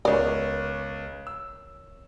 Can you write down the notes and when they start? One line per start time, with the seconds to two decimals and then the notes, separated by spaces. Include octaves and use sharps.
0.05 C#2 B3 A#4 C#5 D5
1.27 E6